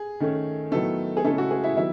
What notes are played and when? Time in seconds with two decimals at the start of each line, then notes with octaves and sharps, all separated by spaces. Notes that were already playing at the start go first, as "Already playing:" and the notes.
Already playing: G#4
0.20 D#3 A3 C#4
0.72 D#3 F#3 A3 B3 E4 A4
1.17 G#4
1.24 C#3 G#3 A3 C#4 E4 A4
1.38 F#4
1.51 G#4
1.64 E4 E5
1.77 D#3 F#3 B3 E4 E5